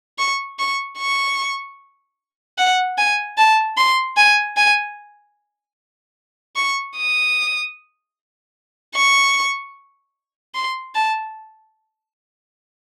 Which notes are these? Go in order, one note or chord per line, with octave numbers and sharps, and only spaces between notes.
C#6
C#6
C#6
F#5
G#5
A5
C6
G#5
G#5
C#6
D#6
C#6
C6
A5